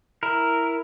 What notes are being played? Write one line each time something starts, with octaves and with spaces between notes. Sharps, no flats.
E4 A#4